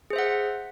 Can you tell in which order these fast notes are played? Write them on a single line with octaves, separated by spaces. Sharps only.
G#4 C5 E5 F#5